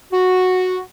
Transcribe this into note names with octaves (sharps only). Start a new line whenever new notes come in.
F#4